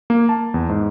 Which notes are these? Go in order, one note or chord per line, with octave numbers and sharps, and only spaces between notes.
A#3
A5
E2
G#2